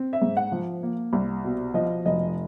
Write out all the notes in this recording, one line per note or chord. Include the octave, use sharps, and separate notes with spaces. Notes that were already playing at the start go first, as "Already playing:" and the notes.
Already playing: C4
E5
G#2
F#5
F3
A#3
C2
B2
F3 D#5
F1 D#5